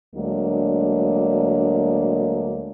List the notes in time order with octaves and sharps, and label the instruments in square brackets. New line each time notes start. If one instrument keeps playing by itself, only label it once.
[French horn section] D2 F#3 G#3 A#3 D4